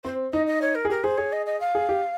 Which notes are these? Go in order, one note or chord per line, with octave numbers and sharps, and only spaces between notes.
C4 C5
D#4 D#5
D#5
C#5
A#4
G#4
G4 A#4
G#4 C5
G#4 C#5
D#5
D#5
F5
G#4
G4